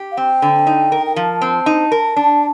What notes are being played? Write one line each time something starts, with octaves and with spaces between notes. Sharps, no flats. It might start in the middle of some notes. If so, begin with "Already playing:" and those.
Already playing: G4
F5
C4 G5
D3
D#4
A#4
G5
F3 A5
C4
D#4
A#4
D4